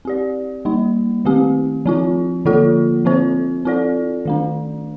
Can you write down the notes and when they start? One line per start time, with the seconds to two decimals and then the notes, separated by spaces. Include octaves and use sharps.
0.05 C4 G4 D5
0.65 G3 A#3 D#4
1.25 D#3 A3 C4 G4
1.86 F3 C4 F4
2.45 D3 F3 A#3 F4 A4
3.05 F3 C4 F4 C5
3.65 C4 F4 A4 D5
4.25 D#3 A3 D4